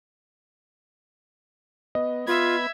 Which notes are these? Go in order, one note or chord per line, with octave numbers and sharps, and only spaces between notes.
B3 D#5
B3 F4 E5 B5 G#6